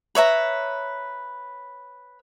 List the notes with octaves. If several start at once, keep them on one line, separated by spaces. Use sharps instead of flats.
B4 C#5 E5 A#5